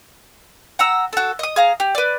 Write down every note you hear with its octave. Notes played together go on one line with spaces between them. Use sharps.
F#5 A#5 E6
F#4 A4
D#5 D#6
G#4 F5 A#5
G4
B4 D5